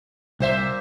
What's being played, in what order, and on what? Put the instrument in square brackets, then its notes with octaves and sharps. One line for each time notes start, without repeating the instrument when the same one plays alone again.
[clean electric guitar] C2 [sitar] A#2 C5 E5